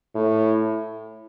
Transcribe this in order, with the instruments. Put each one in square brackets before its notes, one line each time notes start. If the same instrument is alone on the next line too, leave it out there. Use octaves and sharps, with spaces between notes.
[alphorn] A2